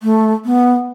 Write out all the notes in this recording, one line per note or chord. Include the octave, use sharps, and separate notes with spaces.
A3
B3